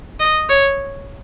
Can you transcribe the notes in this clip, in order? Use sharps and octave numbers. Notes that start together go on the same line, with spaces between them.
D#5
C#5